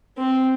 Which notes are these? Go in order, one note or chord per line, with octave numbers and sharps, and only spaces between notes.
C4